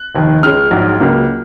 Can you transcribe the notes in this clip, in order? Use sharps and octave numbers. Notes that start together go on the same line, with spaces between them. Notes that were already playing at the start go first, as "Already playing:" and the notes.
Already playing: F#6
F1 D#2 D#3
C#2 C#3 G#3 C#4 F6
A#1 G#2 F#3
C#2 C#3 F#3 A#3